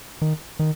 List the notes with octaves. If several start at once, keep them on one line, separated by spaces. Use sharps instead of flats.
D#3
D#3